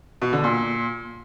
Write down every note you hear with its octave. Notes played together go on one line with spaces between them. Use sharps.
B2
D3
A#2